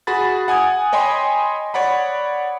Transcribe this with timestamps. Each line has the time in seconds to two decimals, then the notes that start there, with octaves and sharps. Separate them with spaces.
0.07 F#4 G#4 B5 A6
0.48 F#5 G#5 D#6 G#6
0.93 C#5 D#5 G5 G#5 B5 C6
1.74 C#5 D5 F#5 B5